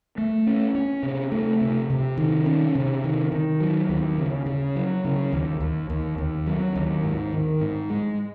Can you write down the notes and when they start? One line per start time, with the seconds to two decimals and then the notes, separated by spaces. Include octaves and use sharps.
0.18 A3
0.46 C#4
0.75 C#4
1.03 C3
1.32 A3
1.61 C3
1.90 C3
2.17 D#3
2.46 C#4
2.75 C3
3.04 D#3
3.32 D#3
3.60 F#3
3.89 D#2
4.18 C#3
4.46 C#3
4.76 F#3
5.04 C#3
5.33 D#2
5.60 D#2
5.90 D#2
6.18 D#2
6.46 F#3
6.75 D#2
7.03 G#2
7.33 D#3
7.61 G#2
7.90 G#3